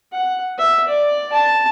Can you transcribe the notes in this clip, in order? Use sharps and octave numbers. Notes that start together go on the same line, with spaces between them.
F#5
E5
D5
A5